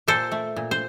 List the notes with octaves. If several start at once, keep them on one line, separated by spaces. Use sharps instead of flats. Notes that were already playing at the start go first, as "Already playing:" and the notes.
A#2 A4 C5
A3
A#2
C5